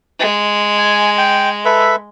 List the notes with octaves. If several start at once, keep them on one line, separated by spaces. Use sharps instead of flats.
G#3
G#5
G5
A4 B4 E5